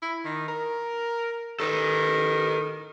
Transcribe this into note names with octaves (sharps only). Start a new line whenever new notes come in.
E4
D#3
A#4
D#3 A4 B4